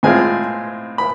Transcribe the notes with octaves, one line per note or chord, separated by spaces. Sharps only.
A2 G#3 C4 F4 G#5
B5